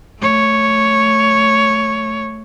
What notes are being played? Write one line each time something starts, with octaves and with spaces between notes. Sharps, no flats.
A3 C#5